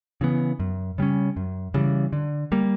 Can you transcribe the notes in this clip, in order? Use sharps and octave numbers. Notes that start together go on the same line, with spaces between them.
C#3 E3 B3
F#2
C#3 G3 C#4
F#2
C#3 E3 G3
D3
G3 A#3